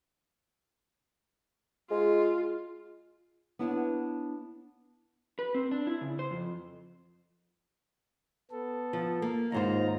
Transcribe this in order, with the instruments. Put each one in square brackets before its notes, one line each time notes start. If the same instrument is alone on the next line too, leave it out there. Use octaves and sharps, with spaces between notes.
[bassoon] G#3 [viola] F4
[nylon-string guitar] B3 D4 E4 C#5 F#5
[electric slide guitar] B4
C4
D4
E4
C#3
C5
F2
[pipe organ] B3 A4
[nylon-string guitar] F3
A#3
[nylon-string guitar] D#2 G#2 C5 [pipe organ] D#4 F4 A#5